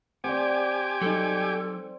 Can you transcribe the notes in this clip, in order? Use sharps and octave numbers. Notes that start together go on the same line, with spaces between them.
C4 G4 D5 F#5 G#5 D6
F#3 G3 D#4 A4